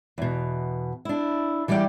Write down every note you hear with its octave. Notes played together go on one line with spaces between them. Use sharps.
E2 B2
D4 E4
E3 G3 G4 G#4 D5 G5